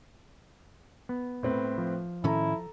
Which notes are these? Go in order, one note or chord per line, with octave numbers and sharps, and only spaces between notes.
B3
A2 C4 B4
F3
A2 D#3 C#4 E4 A4 A#5